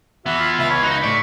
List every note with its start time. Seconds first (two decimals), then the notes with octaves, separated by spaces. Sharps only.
0.26 E3 B3 F#4 E5
0.38 F4
0.59 C#2 E5
0.70 C#5 B5
0.83 D#4 F#4
1.04 A2 D5 C#6